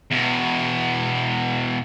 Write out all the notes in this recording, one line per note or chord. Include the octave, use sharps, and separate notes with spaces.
E2 B2